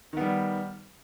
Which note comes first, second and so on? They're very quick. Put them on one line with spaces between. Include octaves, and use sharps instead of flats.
D#3 B3 G3